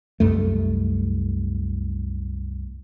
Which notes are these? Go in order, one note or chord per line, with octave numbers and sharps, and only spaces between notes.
C2 F#2 A3